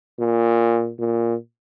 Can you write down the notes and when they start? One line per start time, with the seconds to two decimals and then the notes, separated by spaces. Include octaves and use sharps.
0.19 A#2
0.99 A#2